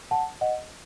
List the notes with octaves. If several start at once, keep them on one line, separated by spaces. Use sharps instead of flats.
F#5 A5
D#5 F#5